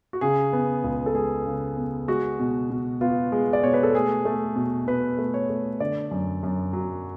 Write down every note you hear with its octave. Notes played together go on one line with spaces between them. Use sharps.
F#4
C#3 G#4
B3
C#2
A4
G#3 G#4
C#3
B3
G#3 F#4
B2
B2
B3 F4
G#3
D5
B2 C#5
B4
A4
A3 G#4
A3
B2
B2 B4
A3
C#5
A3
D3 D5
F#2
F#2
F#3